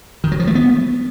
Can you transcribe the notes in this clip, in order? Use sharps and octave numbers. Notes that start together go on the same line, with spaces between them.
D#3
F#3
F3
A3
B3